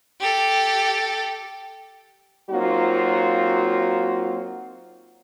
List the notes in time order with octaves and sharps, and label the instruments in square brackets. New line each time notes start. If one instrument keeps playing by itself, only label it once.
[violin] G4 A4
[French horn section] F#3 A#3 C4 D#4 F4 F#4